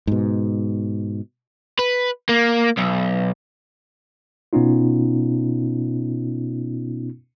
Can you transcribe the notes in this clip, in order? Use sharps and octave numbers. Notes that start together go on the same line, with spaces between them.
G#2 B2
B4
A#3
B1
B2 B3 C#4 D#4 F4